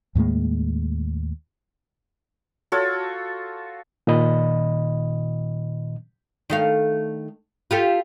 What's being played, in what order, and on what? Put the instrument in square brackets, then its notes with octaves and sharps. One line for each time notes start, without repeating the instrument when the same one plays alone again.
[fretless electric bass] D#2 A2 G#3 A#3
[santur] F4 F#4 A4 C#5
[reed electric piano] A#2 D#3 D#5 B5
[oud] D#3 A3 F5
F4 G4 A4